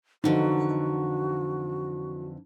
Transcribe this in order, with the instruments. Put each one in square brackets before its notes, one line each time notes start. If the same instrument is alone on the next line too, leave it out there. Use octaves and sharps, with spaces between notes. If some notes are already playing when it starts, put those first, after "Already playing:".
[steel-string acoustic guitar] F2 D3 E3 [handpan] D#4 [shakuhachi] F#4